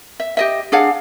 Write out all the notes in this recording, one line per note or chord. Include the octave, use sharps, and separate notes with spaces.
E5
G4 D#5 E5
D4 G#4 F5 F#5